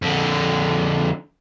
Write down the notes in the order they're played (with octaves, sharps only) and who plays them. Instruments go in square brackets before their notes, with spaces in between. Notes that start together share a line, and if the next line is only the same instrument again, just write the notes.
[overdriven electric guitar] F2 D3